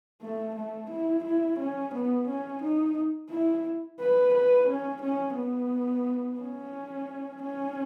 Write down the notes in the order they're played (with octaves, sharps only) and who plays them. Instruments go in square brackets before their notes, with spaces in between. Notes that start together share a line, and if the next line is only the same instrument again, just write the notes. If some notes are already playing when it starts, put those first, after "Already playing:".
[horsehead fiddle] A3
A3
E4
E4
C#4
B3
C#4
D#4
E4
B4
B4
C#4
C#4
B3
C#4
C#4